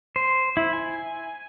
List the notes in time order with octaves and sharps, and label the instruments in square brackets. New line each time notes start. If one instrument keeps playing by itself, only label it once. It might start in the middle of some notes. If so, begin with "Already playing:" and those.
[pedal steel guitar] C5
E4
G#5